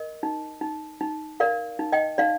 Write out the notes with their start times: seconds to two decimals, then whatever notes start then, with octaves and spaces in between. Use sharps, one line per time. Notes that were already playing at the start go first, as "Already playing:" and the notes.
Already playing: A#4 D#5
0.23 D#4
0.61 D#4
1.01 D#4
1.40 A#4 D5 F5
1.79 D#4
1.92 D#5 G5
2.18 D#4 D5 F5